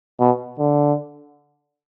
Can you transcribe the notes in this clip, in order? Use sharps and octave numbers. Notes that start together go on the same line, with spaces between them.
B2
D3